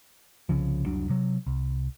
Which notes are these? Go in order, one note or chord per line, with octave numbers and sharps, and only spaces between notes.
C2 C#3 F3
F1 C2 F#3 D4
C3 F#3
C2